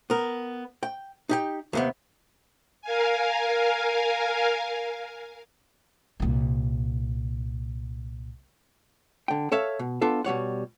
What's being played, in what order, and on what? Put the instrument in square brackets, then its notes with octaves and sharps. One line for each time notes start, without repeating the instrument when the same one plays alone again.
[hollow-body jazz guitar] B3 A#4
G5
D#4 G4 G5
D#2 C3 B3
[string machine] A#4 F5 G#5
[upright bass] C2 A#2
[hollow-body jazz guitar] D3 G5
A4 C#5 E5 F5
B2
B3 D4 F4 A4
B2 G3 C#5 F#5